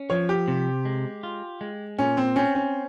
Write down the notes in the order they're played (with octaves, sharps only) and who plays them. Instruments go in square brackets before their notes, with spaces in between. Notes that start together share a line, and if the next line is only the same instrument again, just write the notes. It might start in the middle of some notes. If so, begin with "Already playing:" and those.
Already playing: [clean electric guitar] C#4
[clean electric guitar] F3 [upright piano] C#5
[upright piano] G4
[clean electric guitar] C3
G#3
F4
G#3
[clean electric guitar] A#2 [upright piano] C#4
[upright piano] C4
[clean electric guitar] C4 [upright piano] C#4
[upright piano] C#4